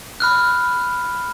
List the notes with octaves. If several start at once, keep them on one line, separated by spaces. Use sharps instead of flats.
B5 F6 F#6